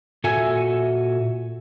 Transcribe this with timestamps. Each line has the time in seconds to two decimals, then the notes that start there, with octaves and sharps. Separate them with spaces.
0.24 A#2 F#4 A4 E5 G#5